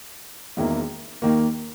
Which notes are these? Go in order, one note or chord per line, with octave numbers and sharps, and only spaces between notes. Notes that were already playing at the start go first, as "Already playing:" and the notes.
E1 E2 D#3 A#3 E4
D#2 D#3 A#3